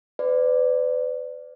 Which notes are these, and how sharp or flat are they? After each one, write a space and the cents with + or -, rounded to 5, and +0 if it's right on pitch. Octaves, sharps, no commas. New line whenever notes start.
B4 +40 D5 +0